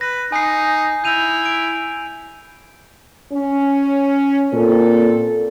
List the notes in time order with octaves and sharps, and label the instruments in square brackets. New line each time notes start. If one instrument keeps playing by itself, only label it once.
[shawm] B4 [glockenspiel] A#6
[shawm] D#4 [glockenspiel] G#5 C7
[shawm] E4 [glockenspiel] G6 D#7 F7
[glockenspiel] D7
[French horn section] C#4
[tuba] A#2 [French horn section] C4 A4